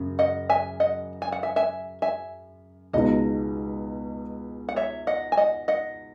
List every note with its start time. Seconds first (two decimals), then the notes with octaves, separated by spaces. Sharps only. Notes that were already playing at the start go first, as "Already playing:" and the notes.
Already playing: F#2 C#3
0.19 D#5 F#5
0.49 E5 G#5
0.80 D#5 F#5
1.22 G#5
1.32 F#5
1.43 E5 G#5
1.56 E5 G#5
2.02 E5 G#5
2.93 C#2 B2 G#3 D#4 D#5 F#5
4.69 F#5
4.76 C#5 E5
5.07 D#5 F#5
5.32 G#5
5.37 D#5 F#5
5.68 D#5 F#5